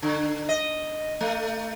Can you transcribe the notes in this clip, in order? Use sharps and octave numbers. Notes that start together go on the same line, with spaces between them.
D3
D#5
A3